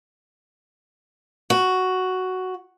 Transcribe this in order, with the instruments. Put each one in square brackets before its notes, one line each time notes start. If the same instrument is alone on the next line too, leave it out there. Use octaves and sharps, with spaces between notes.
[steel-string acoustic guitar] F#4